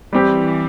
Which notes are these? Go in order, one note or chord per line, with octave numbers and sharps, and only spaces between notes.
E3 G3 C4 G4